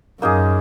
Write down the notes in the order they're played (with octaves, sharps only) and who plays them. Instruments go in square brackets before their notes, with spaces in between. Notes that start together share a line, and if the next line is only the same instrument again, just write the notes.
[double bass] F#2 [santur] A#3 D#4 G#4